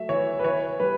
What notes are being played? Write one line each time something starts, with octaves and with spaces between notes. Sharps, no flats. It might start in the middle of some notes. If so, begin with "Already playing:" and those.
Already playing: F#3 A3 E5
E3 C#5
B4
E3 C#5
G3 B4